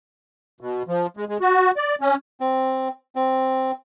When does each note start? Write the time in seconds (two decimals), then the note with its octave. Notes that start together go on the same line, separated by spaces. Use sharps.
0.61 B2
0.88 F3
1.17 G#3
1.28 G#3
1.41 F#4
1.77 D5
2.01 C#4
2.40 C4
3.16 C4